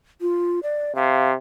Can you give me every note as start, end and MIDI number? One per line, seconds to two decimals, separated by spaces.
0.21 0.60 65
0.63 0.93 74
0.96 1.34 48
0.96 1.28 77